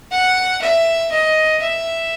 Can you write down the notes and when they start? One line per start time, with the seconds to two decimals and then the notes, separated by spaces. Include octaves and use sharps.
0.11 F#5
0.62 E5
1.12 D#5
1.62 E5